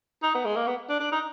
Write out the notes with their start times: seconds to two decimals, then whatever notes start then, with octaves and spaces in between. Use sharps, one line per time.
0.23 D#4
0.34 B3
0.45 G#3
0.56 A#3
0.67 B3
0.89 D4
1.00 D4
1.12 D#4